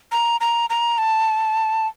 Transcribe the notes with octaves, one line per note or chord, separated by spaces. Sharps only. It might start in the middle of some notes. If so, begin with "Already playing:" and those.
A#5
A#5
A#5
A5